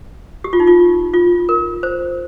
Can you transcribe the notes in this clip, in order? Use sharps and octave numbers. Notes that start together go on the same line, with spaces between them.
G4
F4
D#4
F4
F4
A#4
C5